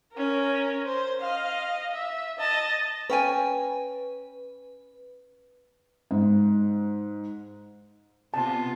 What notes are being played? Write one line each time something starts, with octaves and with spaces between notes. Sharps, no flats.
C#4 A#4
C5
D#5 F5
E5
D#5 A5
C#4 B4 G5 G#5
G#2
C3 B3 F4 A5